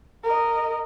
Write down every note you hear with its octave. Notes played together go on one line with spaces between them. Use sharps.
A#4 D#5